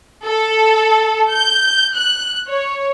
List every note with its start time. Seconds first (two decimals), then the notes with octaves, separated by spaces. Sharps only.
0.23 A4
1.30 G6
1.93 F#6
2.48 C#5